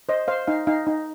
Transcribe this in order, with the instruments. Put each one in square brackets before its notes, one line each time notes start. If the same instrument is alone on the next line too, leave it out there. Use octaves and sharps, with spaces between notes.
[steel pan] C5 D#5
C5 F5
D#4 F5
D#4 F5
D#4